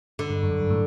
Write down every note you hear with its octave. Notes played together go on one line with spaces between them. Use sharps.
D3
G2
F#2
G2
F#2
A2